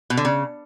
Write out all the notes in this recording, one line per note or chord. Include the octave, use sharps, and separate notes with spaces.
B2
D3
C#3